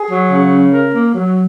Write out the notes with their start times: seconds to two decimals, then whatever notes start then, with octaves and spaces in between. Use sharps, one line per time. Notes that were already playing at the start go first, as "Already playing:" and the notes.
Already playing: G#4
0.10 F#3
0.30 C#3
0.52 C#4
0.73 A#4
0.93 A#3
1.14 F#3